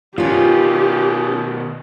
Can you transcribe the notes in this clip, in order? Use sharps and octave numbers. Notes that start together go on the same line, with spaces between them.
B2 D#3 C#4 F4 G4